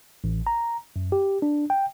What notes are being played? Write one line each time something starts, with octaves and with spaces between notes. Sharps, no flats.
A1
A#5
F#2
G4
D4
G5